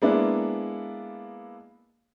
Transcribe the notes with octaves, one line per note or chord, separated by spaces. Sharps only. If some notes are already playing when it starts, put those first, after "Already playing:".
G#3 A#3 B3 D4 E4